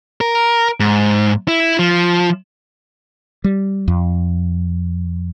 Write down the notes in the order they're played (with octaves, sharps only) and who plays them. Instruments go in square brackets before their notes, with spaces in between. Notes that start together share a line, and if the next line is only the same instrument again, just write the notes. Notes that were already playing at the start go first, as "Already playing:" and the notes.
[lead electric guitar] A#4
G#2
E4
F3
[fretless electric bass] G3
F2